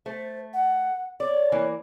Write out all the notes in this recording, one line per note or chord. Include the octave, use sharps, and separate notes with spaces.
A3 C5
F#5
C#5 D5
E3 A#3